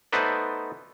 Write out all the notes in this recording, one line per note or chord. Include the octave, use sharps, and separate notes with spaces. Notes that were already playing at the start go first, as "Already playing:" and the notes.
A3 B3 D#4 B4 C5 D5